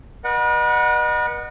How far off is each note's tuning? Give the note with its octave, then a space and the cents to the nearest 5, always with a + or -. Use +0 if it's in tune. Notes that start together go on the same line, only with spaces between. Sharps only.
B4 -40 D#5 -35 F#5 -5